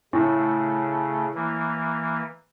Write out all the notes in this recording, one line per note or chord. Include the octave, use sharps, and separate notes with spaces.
A2 C#3 A3
E3 A#3